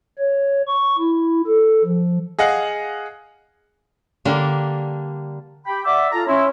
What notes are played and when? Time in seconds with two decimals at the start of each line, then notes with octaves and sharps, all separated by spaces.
0.18 C#5
0.67 C#6
0.98 E4
1.46 A4
1.85 F3
2.39 G#4 D#5 F5 F#5
4.25 D3 G3 A#3 D4
5.67 G4 G5 B5
5.85 D5 E5 F#5 D6
6.12 F4 A4 A5 A#5
6.28 C#4 E4 C#5 C6